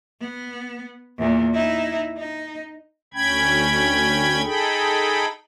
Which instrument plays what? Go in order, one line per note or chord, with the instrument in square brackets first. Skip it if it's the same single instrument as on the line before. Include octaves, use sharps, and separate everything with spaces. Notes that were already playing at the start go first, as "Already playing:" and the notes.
[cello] B3
E2 A#2
D#4 E4
D#4
[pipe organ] D2 C#4 G5 B5 G#6
D#4 G#4 A4 G5 B5